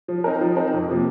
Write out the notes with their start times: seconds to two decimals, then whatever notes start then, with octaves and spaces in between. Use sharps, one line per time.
0.08 F3
0.24 C4 D#4 A#4
0.41 F3
0.56 C4 D#4 A#4
0.73 F2
0.88 C3 F3 A#3